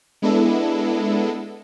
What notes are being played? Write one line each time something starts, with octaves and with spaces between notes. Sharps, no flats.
G#3 B3 D4 E4 A4